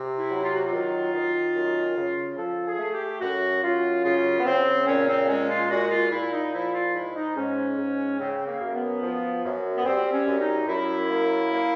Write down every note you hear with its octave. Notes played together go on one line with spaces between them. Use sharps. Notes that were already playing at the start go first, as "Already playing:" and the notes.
Already playing: C3
E4
F#3
F4
F#4
F4
D#3
D#3
F#2
C#3
F3 A4
G#4
A3
G4
F#2 F#4
F#2 F4
C#3 F4
B3
C#3 C4
A#2 C#4
C4
G#3 C#4
F4
A#2 F#4
F4
A#2 E4
D#4
F3 E4
F4
G#2 E4
D#4
G#2 C#4
G#2
C#3 C4
A#3
F#2
B3
F3
F#2
B3
G3 C4
C#4
F#2
D#4
F#2 E4
A#3
A#3